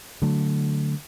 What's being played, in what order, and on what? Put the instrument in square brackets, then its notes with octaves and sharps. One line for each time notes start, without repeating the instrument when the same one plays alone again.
[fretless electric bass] D3 F#3 A3